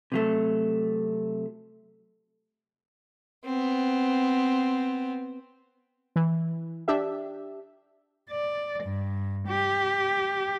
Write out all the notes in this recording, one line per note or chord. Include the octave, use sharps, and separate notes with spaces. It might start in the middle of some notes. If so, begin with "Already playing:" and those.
C3 F#3 A3
B3 C4
E3
D4 G4 E5
D5
G2
G4